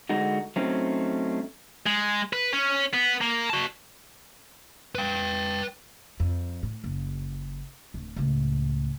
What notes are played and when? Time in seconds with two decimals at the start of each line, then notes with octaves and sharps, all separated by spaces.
0.09 D3 G#3 D#4 F#4
0.56 F#3 A3 C4 C#4 D#4
1.86 G#3
2.33 B4
2.53 C#4
2.93 B3
3.21 A#3
3.50 F#4 A5
4.95 B4 G5
6.20 F2
6.63 A2
6.84 F#1
7.94 D1
8.16 C#2 A2